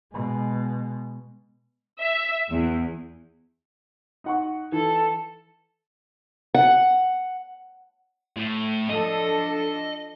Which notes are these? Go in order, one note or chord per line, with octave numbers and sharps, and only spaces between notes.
B2 G#3
E5
E2
D#4 F#5 C#6
E3 A4
F#5
A2 A3
F3 D4 A4 D#5